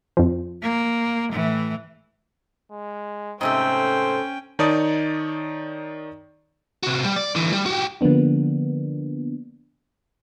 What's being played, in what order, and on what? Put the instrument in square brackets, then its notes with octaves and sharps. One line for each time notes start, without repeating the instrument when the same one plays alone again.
[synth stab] F2 F3
[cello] A#3
A2 E3
[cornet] G#3
[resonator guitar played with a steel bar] G#2 C3 A3 [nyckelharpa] C#4 G5 [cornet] C5
[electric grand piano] D#3 D#4 C#5 D5 A5 D#6
[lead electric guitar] C3 F#4
G3
D5
D3 E3
G3
F#4 G4
[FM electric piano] D3 F3 A#3 B3 D4